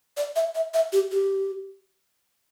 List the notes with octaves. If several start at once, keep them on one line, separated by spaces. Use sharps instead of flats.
D5
E5
E5
E5
G4
G4